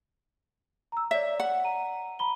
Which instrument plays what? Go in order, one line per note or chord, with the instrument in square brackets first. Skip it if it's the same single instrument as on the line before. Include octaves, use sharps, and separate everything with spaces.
[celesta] A#5 E6
[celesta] C#5 D5 [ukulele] E5
[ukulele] F#5
[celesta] A#5 D#7
A#5 B5 G7